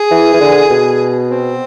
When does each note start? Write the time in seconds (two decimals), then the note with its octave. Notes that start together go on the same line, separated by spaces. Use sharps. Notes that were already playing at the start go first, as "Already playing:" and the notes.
Already playing: G#4
0.11 E3
0.34 E3
0.41 D3
0.70 B2
1.31 C4